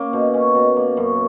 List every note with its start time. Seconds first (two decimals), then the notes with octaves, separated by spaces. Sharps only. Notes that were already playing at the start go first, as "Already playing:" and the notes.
Already playing: A#3 C#4
0.13 B2
0.34 C#4
0.55 B2
0.76 A#3
0.97 F#2